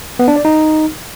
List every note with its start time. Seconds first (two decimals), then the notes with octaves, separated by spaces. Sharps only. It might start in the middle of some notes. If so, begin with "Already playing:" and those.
0.19 B3
0.28 D4
0.36 D5
0.45 D#4